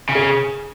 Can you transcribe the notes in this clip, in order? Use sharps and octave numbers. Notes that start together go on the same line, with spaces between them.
C#3
G#4